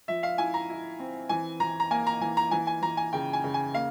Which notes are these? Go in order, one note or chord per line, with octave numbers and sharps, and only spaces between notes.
F3 E5
F5
E4 G#5
A#5
E4
C4
E3 G#5
E3 A#5
A#5
A#3 G#5
A#5
E3 G#5
A#5
E3 G#5
G#5
E3 A#5
G#5
C#3 G5
G#5
C#3
G#5
A#3 F5